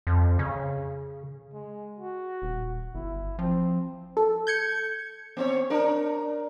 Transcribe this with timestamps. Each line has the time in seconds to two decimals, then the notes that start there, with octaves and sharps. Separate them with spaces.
0.07 F2
0.39 C#3
1.53 G#3
1.99 F#4
2.42 D#1
2.95 G1 E4
3.39 F3 C4
4.17 A4
4.47 G6 G#6 C#7
5.37 B3 C4 C#5
5.70 D4 A#4